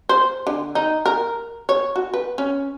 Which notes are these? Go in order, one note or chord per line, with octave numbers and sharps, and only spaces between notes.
C5
D3
D#4
A#4
C#5
F#4
B4
C#4